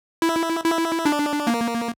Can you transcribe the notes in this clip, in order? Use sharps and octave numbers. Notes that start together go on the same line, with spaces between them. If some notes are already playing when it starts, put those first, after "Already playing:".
E4
E4
D4
A#3